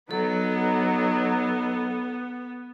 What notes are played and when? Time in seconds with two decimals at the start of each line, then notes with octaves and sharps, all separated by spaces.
0.11 F#3 B3 D#4 A4